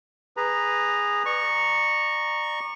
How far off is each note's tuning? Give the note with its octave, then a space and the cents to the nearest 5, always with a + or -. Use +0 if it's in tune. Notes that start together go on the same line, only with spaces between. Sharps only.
G#4 -15 B4 +0 A#5 +0
D5 +35 A#5 +0 C#6 -5